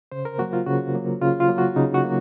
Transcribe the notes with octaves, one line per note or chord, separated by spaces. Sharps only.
C#3 C5
A#4
F#3 A#3 F#4
F4
C#3 F#4
F#3 A#3
C#3 F4
F4
F#3 A#3
F#4
C#3 D#4
F#4
F#3 A#3